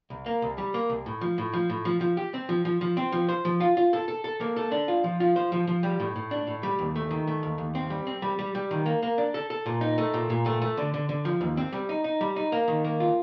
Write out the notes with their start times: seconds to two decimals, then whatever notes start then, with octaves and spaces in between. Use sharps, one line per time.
0.10 C2
0.26 A#3
0.42 C2
0.58 G3
0.74 A#3
0.90 C2
1.06 A2
1.21 F3
1.38 A2
1.53 F3
1.70 A2
1.85 F3
2.01 F3
2.17 G4
2.34 C4
2.49 F3
2.65 F3
2.81 F3
2.97 C4
3.12 F3
3.29 C5
3.45 F3
3.60 F4
3.77 F4
3.93 A4
4.08 A4
4.24 A4
4.40 A#3
4.57 A4
4.71 D4
4.88 F4
5.04 F3
5.20 F4
5.36 C5
5.52 F3
5.67 F3
5.83 G3
6.00 A2
6.16 A2
6.31 D4
6.47 A2
6.63 G3
6.79 D#2
6.96 A3
7.11 D#3
7.27 A3
7.43 D#2
7.58 D#2
7.75 C4
7.90 G3
8.07 C4
8.22 G3
8.39 G3
8.55 G3
8.71 D#3
8.86 A#3
9.03 A#3
9.18 D4
9.34 A4
9.50 A4
9.66 A#2
9.81 D#4
9.98 A3
10.14 A#2
10.30 A#2
10.46 A3
10.62 A3
10.77 D3
10.94 D3
11.09 D3
11.25 F3
11.41 D#2
11.57 C4
11.73 G3
11.89 D#4
12.04 D#4
12.21 G3
12.36 D#4
12.52 A#3
12.68 D#3
12.84 A#3
13.00 F4